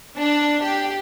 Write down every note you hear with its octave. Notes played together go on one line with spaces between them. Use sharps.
D4
G4